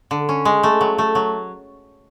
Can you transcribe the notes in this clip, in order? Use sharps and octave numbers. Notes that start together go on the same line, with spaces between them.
D3
C#4
G#3
A3
F#3
A3
F#3